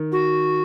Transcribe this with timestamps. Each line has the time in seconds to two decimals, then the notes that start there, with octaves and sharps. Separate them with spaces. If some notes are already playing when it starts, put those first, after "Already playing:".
Already playing: D#3
0.12 F#4